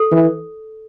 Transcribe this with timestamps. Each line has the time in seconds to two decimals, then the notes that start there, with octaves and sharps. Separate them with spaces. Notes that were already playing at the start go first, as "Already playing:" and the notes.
Already playing: A4
0.12 E3